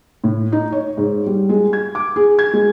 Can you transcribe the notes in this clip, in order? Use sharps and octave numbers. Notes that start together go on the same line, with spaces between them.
A2
D#4
C#5
G#2
G3
G#3
G#6
D6
G#4
G#6
G#3